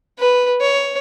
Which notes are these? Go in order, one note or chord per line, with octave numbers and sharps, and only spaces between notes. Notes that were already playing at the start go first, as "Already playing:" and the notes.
B4
C#5